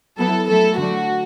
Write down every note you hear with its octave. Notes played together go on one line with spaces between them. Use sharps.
F#3 B3 E4 A4
F#3 A3 E4 A4
D3 F#3 A3 D4 F#4